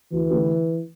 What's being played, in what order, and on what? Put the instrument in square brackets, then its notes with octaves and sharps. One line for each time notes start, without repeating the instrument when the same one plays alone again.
[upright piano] D2 [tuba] E3
[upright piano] D3 A3 G4 B4